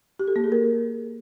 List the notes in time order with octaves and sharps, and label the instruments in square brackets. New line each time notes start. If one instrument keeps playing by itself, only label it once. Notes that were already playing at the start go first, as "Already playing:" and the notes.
[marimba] G4
A4
A#3
G#4
A#4